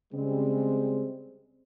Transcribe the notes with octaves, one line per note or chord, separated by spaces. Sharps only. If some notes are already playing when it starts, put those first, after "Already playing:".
C#3 G3 G#3 C4